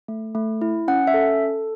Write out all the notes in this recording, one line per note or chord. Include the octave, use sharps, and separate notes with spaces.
A3
A3
E4
C#4 F#5
E5
A4